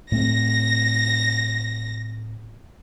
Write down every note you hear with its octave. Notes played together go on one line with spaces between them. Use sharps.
A2 A3 C4 A#6